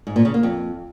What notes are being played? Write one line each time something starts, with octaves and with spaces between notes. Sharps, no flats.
G#2
A#2
C#3
A#3
F2